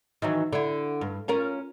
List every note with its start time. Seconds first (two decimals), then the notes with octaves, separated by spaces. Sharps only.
0.22 D#3 E3 F#3
0.53 D3 E4
1.01 G2
1.28 C#4 F4 A#4